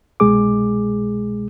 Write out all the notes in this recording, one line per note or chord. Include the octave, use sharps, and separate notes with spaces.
C2 B2 G#3 G#4 D6